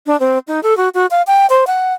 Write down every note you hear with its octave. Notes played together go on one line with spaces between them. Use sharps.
D4
C4
D#4
A4
F#4
F#4
F5
G5
C5
F#5